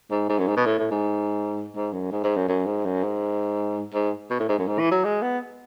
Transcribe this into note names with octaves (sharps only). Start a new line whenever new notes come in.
G#2
G#2
F#2
G#2
B2
A2
A2
G#2
G#2
F#2
G#2
G#2
F#2
F#2
G#2
F#2
G#2
G#2
B2
A2
G#2
F#2
G#2
E3
F#3
G#3
B3